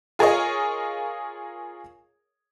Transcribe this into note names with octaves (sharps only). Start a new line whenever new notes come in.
F4 G#4 A#4 C#5 D#5